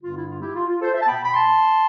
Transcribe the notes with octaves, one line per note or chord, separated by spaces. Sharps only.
G2 D3 G3 B3 F4
E4
F4
E4 G4
F4
F4
A4 C5
C5 E5
A5
B2 B3 G5 B5
B5
A5 C6